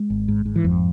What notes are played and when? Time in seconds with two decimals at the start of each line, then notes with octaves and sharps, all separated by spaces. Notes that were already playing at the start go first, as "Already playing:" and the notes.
Already playing: G#3
0.10 G#1
0.28 G#2
0.46 G#2
0.56 E3
0.64 G#1 F2 F3